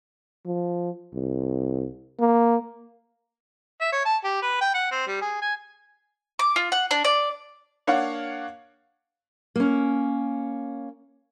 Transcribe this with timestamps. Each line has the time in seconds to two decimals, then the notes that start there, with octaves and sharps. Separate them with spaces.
0.46 F3
1.13 C2
2.20 A#3
3.81 E5
3.92 C#5
4.05 A5
4.24 G4
4.42 B4
4.61 G5
4.75 F#5
4.92 C4
5.08 G3
5.22 G#4
5.42 G#5
6.39 D6
6.56 F4
6.72 F#5
6.91 D4
7.05 D5
7.87 A#3 D4 C#5 F5 F#5
9.56 A#3 C#4